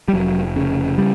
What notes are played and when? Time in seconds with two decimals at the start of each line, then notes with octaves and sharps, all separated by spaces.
0.08 G3
0.13 F1 F#3
0.56 C#3
0.98 C#3 G3